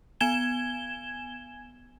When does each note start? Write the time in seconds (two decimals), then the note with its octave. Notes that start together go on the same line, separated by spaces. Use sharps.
0.20 B3 G#5 G#6 E7 G7